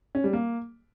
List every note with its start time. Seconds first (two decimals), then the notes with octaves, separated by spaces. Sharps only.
0.15 C#4
0.24 G3
0.33 A#3